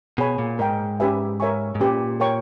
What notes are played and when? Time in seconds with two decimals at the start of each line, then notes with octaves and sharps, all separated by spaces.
0.18 B2 G#4 C#5 G#5 B5
0.39 A#2
0.59 G#2 A#4 D#5 G5
1.00 C#4 G4 B4 E5 G#5
1.40 A#4 C#5 E5 G#5 C#6
1.75 G#2
1.80 A#2 C#4 G4 B4
2.20 A#4 C#5 G5 C#6